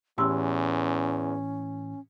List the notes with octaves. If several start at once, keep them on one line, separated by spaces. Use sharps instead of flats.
E2 A2 E3 C#4 G4 C6 E6